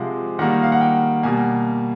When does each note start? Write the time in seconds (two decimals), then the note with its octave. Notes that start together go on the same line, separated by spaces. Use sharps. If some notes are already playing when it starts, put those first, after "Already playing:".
Already playing: C3 F3 G#3 F5 F#5
0.39 D#3 G3 A#3 F#5
0.63 F5
0.72 F#5
0.81 G5
1.23 B2 G3 A#3 G#5